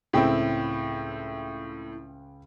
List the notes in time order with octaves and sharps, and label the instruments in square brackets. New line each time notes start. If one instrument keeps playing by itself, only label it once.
[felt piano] C#2 G5 [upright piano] A2 C4 E4